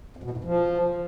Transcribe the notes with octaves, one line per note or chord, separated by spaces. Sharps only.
F2
B2
A2
F2
F3